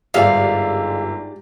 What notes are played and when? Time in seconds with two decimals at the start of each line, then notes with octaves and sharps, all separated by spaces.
0.14 G1 G#2 G#3 G4 D5 E5 F5